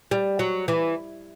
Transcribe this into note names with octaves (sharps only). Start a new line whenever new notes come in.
G3
F#3
E3